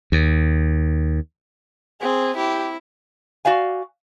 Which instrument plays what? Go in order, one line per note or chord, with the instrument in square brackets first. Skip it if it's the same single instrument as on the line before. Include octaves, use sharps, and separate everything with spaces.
[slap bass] D#2
[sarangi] C4 [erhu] G#4
[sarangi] E4 [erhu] G4
[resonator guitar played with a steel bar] F#4 D5 F5 G#5